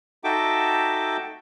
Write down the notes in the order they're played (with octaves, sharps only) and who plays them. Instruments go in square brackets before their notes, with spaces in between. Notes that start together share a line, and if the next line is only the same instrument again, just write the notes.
[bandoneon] D#4 F#4 A4 E5 G5 D6